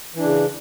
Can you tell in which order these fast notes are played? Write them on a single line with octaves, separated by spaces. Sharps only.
E3 D4 C#3